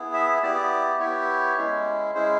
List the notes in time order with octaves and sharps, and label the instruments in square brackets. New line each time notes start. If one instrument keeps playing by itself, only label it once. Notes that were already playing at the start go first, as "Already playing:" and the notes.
Already playing: [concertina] B3 E4 G#4
E5
B3 E4 G4 D5
B3 E4 G4 C#5
G#3 C#4 E4 G#4
G#3 C#4 E4 G#4 C5